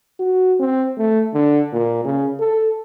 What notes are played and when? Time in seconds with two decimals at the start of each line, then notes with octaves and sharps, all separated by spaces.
0.20 F#4
0.60 C4
0.98 A3
1.34 D3
1.73 A#2
2.05 C#3
2.40 A4